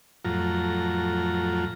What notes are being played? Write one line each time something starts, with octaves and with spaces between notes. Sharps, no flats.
F2 A2 F#3 F4 A#5